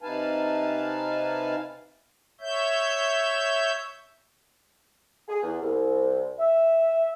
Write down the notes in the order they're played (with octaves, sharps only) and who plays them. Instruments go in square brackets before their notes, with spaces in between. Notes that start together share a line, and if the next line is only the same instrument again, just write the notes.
[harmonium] C3 D#4 B4 F5 G#5 A5
[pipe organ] C#5 E5 G6
[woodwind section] G#4
E2
C2
E5